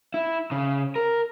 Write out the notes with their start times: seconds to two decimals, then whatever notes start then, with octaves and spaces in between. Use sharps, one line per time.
0.14 E4
0.52 C#3
0.96 A#4